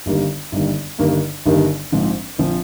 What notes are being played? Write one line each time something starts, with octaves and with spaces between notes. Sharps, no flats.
G1 G2 D#3 G3 A#3
G1 G2 D#3 G3 A#3
G1 G2 D#3 G3 A#3
G1 G2 D#3 G3 A#3
A#1 G#2 F3 C4
A#1 F3 C4